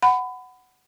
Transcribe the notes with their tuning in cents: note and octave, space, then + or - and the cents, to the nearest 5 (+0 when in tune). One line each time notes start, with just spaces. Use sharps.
F#5 +5 B5 +25